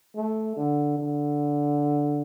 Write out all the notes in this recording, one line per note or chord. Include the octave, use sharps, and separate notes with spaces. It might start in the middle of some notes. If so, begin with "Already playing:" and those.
A3
D3
D3